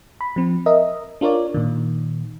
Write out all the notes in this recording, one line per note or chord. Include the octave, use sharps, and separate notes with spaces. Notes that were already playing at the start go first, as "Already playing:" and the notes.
B5
F3 C4
A#4 D#5 E5
D4 F4 A#4 C#5 D5
A#2 D#3